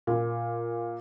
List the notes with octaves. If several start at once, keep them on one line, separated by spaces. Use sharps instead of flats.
A#2